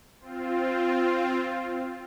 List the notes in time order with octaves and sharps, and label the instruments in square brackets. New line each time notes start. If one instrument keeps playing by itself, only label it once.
[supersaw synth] C4 F4